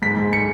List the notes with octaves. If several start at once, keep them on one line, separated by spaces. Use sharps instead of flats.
G#2 B6
G#2
C#7